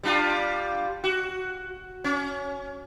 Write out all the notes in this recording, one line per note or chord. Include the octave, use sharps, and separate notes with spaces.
G3 D4 F4
F#4
C#4